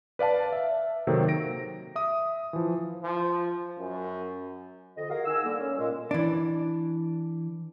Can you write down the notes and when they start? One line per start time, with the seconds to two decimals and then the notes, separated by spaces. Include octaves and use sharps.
0.19 B4 D5 F5 A5
0.52 E5
1.07 C3 D#3 F#3 A#3 C4 A4
1.28 A#6 D7
1.96 E5 D#6
2.53 E3 F3
3.03 F3
3.79 F#2
4.97 F2 D3 D#5
5.10 F#4 G#4 A#4 D#5 F5
5.26 D#3 G#5 E6
5.45 D3 G3 A#3
5.59 C#4
5.77 A#2 G#3
6.11 E3 D4